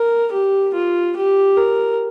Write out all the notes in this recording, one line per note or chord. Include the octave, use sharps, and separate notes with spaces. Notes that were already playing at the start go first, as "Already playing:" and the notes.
Already playing: A#4
G4
F4
G4
A#4